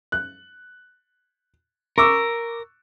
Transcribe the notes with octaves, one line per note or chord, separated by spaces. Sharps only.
F#6
A#4 C#6 D6 E6